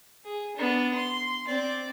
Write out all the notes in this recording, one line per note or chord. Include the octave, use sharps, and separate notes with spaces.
G#4
B3 D4
C6
C4 D5